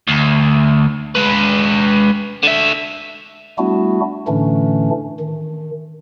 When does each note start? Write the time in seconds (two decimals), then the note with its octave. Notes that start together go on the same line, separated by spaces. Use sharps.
0.08 D2
1.15 G#3 B4
2.43 D3 E5
3.58 G3 A3 B3 D4 E4 F#4
4.28 A2 D3 E3 A3 C#4 D4
5.19 D#3